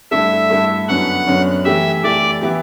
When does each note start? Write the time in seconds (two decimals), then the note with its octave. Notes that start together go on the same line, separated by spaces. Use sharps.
0.11 G2 D3 A3 E4 A4 E5
0.49 G2 D3 A3 E4 A4
0.88 F#2 D3 F#3 B3 F#5
1.27 F#2 D3 F#3 B3
1.65 E3 A3 E4 G4 E5
2.03 E3 A3 E4 G4 D5
2.41 E3 B3 E4 G4